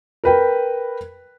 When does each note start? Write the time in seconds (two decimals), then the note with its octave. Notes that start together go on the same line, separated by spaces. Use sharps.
0.24 A#4 B4 G5